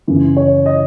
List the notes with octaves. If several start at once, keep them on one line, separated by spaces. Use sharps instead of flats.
F#2 C#3 E3 E4
C#5
D#5